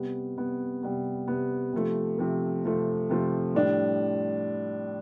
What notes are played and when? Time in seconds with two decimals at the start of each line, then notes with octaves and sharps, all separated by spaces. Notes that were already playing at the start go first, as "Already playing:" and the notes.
Already playing: C3 G3 B3
0.37 C3 G3 B3
0.83 C3 G3 B3
1.28 C3 G3 B3
1.73 C3 F3 A3
2.18 C3 F3 A3
2.64 C3 F3 A3
3.09 C3 F3 A3
3.55 A2 G3 D4